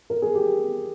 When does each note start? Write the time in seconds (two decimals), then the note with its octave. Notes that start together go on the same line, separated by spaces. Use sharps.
0.10 A#4
0.22 G#4
0.35 G4